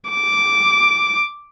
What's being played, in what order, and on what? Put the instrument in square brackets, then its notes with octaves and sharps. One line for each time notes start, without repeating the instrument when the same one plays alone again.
[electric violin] D6